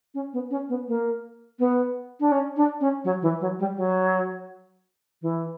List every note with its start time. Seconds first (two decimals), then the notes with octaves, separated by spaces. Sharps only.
0.14 C#4
0.33 B3
0.51 C#4
0.69 B3
0.88 A#3
1.59 B3
2.20 D4
2.32 C#4
2.57 D4
2.81 C#4
3.05 F#3
3.22 E3
3.41 F#3
3.59 G3
3.77 F#3
5.22 E3